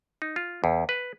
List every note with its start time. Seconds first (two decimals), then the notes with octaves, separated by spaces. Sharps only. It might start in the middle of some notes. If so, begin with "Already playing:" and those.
0.22 D#4
0.36 F4
0.64 E2
0.89 B4